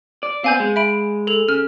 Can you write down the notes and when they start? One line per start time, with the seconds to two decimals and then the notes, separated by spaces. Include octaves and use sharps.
0.23 D5
0.44 B3 C4 F5 G#5 G6
0.60 G#3
0.76 E5 B5 D7
1.27 A4 F7
1.49 C#3 F6